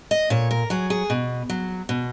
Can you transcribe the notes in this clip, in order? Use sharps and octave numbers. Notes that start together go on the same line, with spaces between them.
D#5
A#2 C#5
A#4
F#3 G#4
G#4
B2
F#3
B2